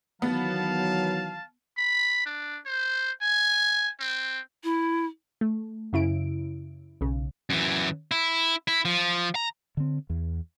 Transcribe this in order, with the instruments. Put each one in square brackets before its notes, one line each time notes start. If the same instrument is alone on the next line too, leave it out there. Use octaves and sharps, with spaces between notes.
[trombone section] D#3 E3 F#3 [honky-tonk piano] B3 [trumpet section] F5 A5
[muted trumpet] B5
D4
C5
G#5
C4
[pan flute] E4
[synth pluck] A3
F#2 C#3 E4 D7
B1 C#3
[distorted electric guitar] F#2 E3
E4
E4
F3
A#5
[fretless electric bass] D3 C4
E2